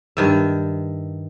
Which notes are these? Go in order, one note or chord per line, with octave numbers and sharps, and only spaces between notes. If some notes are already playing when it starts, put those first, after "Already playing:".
G2 D#3 E5